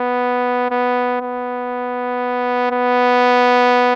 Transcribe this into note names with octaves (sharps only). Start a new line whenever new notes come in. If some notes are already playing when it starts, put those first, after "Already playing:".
Already playing: B3
B3
B3
B3